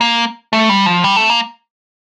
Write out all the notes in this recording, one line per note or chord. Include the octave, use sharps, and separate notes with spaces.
A#3
A3
G3
F3
G3
A3
A#3